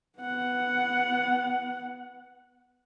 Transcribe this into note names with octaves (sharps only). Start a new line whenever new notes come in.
B3 F#5